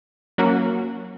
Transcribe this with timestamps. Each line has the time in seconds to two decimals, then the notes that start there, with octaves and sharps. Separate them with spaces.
0.38 F#3 A#3 C#4 F#4 A#4